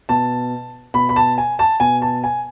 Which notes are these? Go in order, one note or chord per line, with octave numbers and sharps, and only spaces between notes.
B2 A5
B2 B5
B5
A5
G#5
A5
B2 G#5
A5
G#5